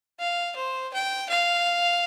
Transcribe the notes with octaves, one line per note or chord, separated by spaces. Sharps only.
F5
C5
G5
F5